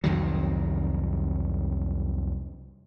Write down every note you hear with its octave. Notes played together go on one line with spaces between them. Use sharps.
C2 F2 D#3 F#3